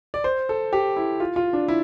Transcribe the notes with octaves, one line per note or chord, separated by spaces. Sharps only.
D5
C5
A4
G4
E4
F4
F4
D4
E4